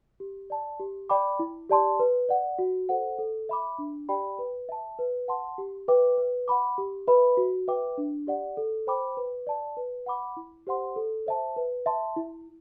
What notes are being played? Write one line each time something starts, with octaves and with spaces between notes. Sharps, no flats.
G4
D5 A5
G4
D5 G5 B5 D6
E4
G4 D5 A5 C6
B4
D5 F#5
F#4
A4 C5 F#5
A4
E5 B5 D6
D4
G4 D5 G5 B5
B4
E5 A5
B4
F#5 A5 C6
G4
B4 E5 G5 D6
B4
F#5 B5 D6
G4
B4 E5 B5
F#4
B4 E5 G5 D6
D4
G4 D5 F#5
A4
C5 G5 B5 D6
B4
D5 A5
B4
F#5 B5 D6
E4
G4 C5 F#5 C6
A4
C5 E5 A5
B4
E5 A5 C6
E4